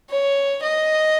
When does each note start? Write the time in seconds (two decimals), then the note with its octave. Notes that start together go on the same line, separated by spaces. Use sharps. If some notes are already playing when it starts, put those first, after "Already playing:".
0.10 C#5
0.63 D#5